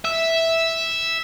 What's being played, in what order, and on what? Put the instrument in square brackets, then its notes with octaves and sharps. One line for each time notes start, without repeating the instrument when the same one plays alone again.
[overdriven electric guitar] E5